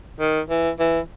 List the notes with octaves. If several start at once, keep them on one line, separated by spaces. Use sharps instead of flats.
D#3
E3
E3